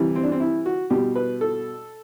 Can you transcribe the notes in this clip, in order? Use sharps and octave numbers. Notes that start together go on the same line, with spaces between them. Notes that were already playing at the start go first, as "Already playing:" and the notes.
Already playing: C3 E3 G3
C4
D4
C4
E4
F#4
B2 G3 G4
B4
A4